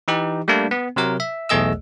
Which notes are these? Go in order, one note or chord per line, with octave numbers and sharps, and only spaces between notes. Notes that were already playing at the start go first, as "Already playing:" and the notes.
E3 D#4 G4
G3 A3 A#3 D4
B3
C3 F#3 A#4
E5
B1 E2 A3 G#4 D#5 E6